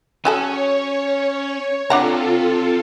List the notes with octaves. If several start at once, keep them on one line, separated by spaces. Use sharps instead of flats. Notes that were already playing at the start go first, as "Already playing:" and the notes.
F#3 C#4 G#4 A4 C#5 G#5
C3 D4 F4 A4 F#5 A#5